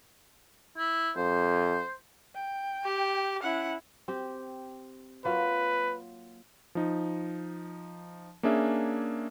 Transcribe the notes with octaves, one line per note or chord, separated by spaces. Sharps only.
E4
F2 C5
G5
G4
C#4 E4 F#5
C4 G4
F#3 A#3 F4 B4
F3 D#4
A#3 C#4 D4 G#4 E5